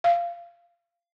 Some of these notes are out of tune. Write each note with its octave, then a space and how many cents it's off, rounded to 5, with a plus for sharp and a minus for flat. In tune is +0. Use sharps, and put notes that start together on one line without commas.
F5 -15